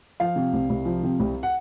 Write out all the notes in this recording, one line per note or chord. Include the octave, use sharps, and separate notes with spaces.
F3 F5
C3
C2
C2
F3
C3
C2
F#5